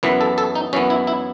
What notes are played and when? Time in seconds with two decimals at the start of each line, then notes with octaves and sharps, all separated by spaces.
0.03 F#2 E3 B3 B4
0.21 A4
0.38 A4
0.55 D#4
0.73 F#2 E3 B3 C#4
0.90 E4
1.07 E4